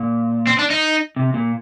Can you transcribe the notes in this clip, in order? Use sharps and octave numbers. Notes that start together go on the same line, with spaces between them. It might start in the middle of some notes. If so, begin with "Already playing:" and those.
Already playing: A#2
C4
D4
D#4
C3
A#2